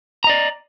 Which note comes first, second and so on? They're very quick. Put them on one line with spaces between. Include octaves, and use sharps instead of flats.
A#5 D#5 D5